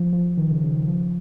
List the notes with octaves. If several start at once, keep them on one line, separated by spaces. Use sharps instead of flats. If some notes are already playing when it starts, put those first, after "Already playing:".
Already playing: F3
F3
D#3
C#3
C#3
D#3
F3